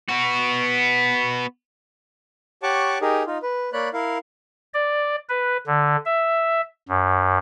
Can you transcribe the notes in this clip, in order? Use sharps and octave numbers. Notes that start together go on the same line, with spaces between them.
B3 F#4
G4 C#5 F#5 A5 C#6 D6
D#4 G4 G#4 A#4
D#4 F4
B4
A#3 C#5 D5 B5 F#6
E4 A#4 F5
D5
B4
D3
E5
F#2